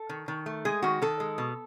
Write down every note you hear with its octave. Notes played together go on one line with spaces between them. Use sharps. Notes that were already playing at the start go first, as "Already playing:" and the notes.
Already playing: A4
D#3
D#3
A3
G#3 G#4
D#3 F#4
D#3 A4
G#3
B2